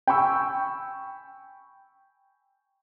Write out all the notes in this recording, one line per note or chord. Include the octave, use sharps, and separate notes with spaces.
G5 G#5 B5 C#6 E6